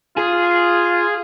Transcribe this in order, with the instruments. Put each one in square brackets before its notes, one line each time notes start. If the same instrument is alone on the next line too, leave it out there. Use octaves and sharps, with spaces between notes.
[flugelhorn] F4 [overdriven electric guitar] G#4